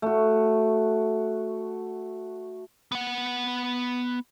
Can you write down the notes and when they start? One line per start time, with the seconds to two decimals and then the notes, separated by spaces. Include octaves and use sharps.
0.02 A3 F#4
2.92 B3 F#5